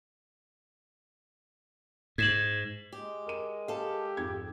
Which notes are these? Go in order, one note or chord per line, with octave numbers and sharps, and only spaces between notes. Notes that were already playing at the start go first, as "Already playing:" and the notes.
G#2 G#6 E7 F#7
G#3 G4
A#4 D#7
G4 A4 F5
F2 G#2 G#6